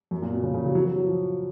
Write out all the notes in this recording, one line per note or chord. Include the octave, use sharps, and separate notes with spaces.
F#2
A#2
B2
C#3
C#3
F#3
F#3
F#3
F#3
F3